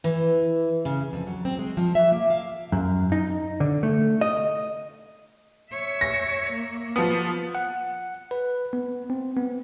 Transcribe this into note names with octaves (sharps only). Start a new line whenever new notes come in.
E3
C#3
F2
F#3
C4
G#3
F3
E5
A#3
F5
F#2
D#4
D3
A3
D#5
C#5 E5
A#6
A#3
F3 B3
F#5
B4
B3
C4
B3